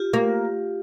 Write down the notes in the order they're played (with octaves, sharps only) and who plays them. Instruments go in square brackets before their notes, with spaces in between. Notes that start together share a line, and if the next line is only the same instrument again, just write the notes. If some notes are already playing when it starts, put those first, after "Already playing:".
Already playing: [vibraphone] F4 G4
[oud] A#3